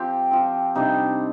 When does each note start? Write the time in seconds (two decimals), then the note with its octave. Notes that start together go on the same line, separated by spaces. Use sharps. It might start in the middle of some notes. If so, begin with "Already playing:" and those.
Already playing: F3 C4 G4
0.31 F3 C4
0.75 C3 G3 D4 D#4